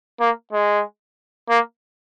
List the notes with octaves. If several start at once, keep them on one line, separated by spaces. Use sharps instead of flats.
A#3
G#3
A#3